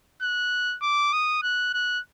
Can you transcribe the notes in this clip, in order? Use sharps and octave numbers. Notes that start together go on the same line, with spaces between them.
F#6
D6
D#6
F#6
F#6